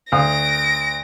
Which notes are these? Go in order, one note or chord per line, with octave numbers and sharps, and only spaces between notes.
D2 F5 D#6 A#6 D7